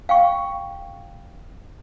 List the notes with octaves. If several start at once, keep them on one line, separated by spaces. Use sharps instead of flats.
F5 G5 C#6